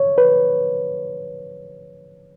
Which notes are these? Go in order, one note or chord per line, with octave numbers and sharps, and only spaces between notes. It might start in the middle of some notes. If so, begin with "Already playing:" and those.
Already playing: C#5
B4